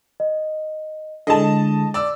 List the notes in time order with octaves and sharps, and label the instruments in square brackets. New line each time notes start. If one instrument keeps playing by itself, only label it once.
[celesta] D#5
[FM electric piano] D3 G#3 [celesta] E4 [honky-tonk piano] D#5 A5
[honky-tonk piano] D5 E6